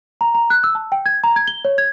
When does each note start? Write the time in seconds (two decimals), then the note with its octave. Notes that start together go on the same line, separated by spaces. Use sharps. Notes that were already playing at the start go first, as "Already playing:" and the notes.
0.21 A#5
0.35 A#5
0.50 F#6
0.64 E6
0.75 A5
0.92 G5
1.06 G#6
1.24 A#5
1.36 G#6
1.48 G7
1.65 C#5
1.78 G#6